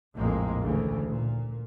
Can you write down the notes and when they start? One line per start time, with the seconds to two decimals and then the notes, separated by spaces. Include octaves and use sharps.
0.16 A#1 F2 A2 G#3 A#3
0.62 D2 C#3 E3
1.15 A#2